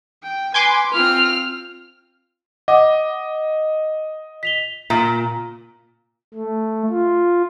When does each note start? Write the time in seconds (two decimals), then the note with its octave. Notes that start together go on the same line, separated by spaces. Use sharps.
0.23 G5
0.54 B4 G#5 C6 D6
0.94 C4 F4 F6
2.68 D#5 F#5 D6
4.43 B6 F7 G7
4.90 A#2
6.34 A3
6.90 F4